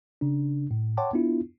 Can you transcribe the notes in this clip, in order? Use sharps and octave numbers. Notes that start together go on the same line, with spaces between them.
C#3 D4
A2
C#5 F#5 G5 A5 C6 D6
B3 D4 E4 F4